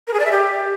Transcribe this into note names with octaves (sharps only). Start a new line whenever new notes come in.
A#4
G#4
D5
E5
G4